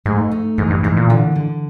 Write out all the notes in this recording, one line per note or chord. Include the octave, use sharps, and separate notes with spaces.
G#2 A3
D#4
G#2 E3
G2
G#2 E3
A#2
D3
D3